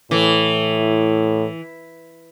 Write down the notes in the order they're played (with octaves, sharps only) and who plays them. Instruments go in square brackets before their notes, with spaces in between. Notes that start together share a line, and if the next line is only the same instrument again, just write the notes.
[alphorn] A2 [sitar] E3